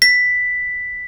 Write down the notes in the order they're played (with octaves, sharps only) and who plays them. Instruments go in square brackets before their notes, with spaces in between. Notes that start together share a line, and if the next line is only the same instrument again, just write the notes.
[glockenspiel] B6